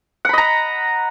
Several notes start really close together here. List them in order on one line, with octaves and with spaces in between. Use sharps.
F#5 B5 D#5 A#5